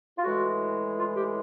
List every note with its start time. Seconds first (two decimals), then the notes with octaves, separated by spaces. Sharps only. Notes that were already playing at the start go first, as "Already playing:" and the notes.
0.18 F4
0.24 A2 E3 G#3 F#4
0.98 F4
1.16 G4